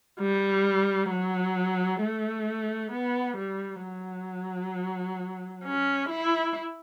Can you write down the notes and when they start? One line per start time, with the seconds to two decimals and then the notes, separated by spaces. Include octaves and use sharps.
0.20 G3
1.11 F#3
2.02 A3
2.92 B3
3.37 G3
3.83 F#3
5.64 C#4
6.09 E4